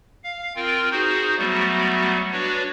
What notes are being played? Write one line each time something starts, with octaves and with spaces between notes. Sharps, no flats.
F5
C4 F4 A#4 G5
D#4 F#4 G#4 C5
F#3 G3 A3 B3 F#4
D4 F#4 B4 C#5 D5